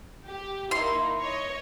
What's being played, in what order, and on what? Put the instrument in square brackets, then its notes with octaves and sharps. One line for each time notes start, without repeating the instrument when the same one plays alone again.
[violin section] G4
[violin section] A#3 D#4 E4 [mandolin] C6
[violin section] C#5 D#5